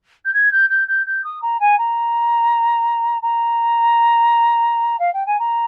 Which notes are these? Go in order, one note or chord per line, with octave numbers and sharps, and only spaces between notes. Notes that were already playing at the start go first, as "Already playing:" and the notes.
G6
G#6
G6
G6
G6
G6
D#6
A#5
G#5
A#5
A#5
F5
G5
G#5
A#5